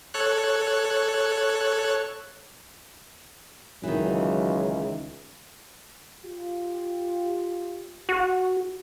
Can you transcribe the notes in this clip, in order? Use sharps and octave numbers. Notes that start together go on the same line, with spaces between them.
A4 C#5 F#6
C#2 D#3 E3 F#3
F4 G4
F#4